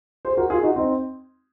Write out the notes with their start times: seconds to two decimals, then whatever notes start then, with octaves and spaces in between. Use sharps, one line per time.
0.25 G#4 C5
0.37 F#4 A#4
0.50 F4 G#4
0.63 D#4 F#4
0.76 C4 D#4